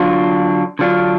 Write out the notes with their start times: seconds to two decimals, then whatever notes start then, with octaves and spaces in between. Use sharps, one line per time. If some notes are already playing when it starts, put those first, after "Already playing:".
Already playing: D3 F#3 D4 F4
0.79 D3 F#3 D4 F4